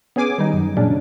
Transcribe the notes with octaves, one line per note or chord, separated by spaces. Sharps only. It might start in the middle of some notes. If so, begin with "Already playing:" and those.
B3 C#4 G#4 G#5 D6
D#3 G3 D#4
F#2
A#2 C#3 F#3 C#4 D4